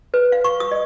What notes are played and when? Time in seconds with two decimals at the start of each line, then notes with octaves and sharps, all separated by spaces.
0.14 B4
0.32 F5
0.44 C#6
0.60 D#6
0.72 D#5